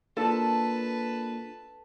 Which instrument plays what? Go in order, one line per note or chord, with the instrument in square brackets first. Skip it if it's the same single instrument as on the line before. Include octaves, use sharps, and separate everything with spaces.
[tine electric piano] A#3 D4 F4 [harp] A4 [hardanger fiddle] B4 A5